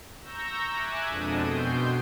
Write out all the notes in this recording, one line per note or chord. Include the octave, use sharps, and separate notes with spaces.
A#5 C#6 E6 G6 A#6
E5 G#5 D6 F#6 G#6
F2 B2 G#3 D4 A4 D#6
F#2 B2 G5 C6 G6